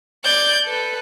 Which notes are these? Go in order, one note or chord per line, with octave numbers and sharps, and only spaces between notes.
D5 G6
A4 B4